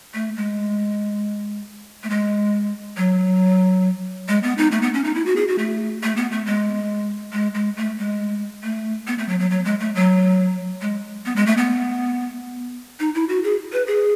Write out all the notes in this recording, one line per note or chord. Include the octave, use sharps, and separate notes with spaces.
A3
G#3
A3
G#3
F#3
G#3
B3
D#4
A3
B3
C#4
D#4
E4
F#4
G#4
F#4
A3
A3
B3
A3
G#3
G#3
G#3
A3
G#3
A3
B3
A3
F#3
F#3
F#3
G#3
A3
F#3
G#3
B3
G#3
A3
B3
D#4
E4
F#4
G#4
B4
G#4